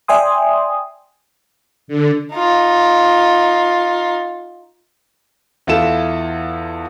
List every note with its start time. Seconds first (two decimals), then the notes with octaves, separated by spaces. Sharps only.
0.08 D5 E5 G5 G#5 C6 D#6
1.88 D3
2.33 D#4 F4
5.67 E2 E3 E4 F4 A4 E7